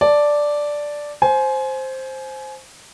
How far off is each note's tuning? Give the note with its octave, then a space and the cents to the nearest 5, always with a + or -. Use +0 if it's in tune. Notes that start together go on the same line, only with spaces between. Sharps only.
D5 +0 A5 +0
C5 +5 G#5 +25